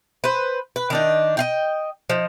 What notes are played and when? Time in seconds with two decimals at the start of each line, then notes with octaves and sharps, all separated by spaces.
0.24 B4 C5
0.76 B4
0.90 D#3 D4 D#4
1.37 D#5 F5 G5
2.10 F3 D#4